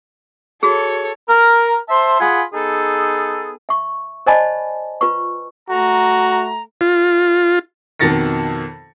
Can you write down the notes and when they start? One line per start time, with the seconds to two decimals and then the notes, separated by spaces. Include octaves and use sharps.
0.63 F#4 G#4 A4 C#5
1.28 A#4
1.89 C5 E5 A5 C6
2.19 F4 G#4 F#5 G#5 B5
2.53 B3 D#4 G#4 A4
3.69 E5 C#6
4.26 C5 D5 D#5 G#5 A5 B5
5.01 F4 B4 C#6
5.69 A3 F#4 A#5
6.81 F4
7.99 F2 B2 D#3 A6 A#6 C#7